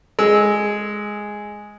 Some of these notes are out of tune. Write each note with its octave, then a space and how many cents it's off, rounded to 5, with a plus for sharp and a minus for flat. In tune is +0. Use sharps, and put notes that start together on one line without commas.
G#3 +0 E6 -20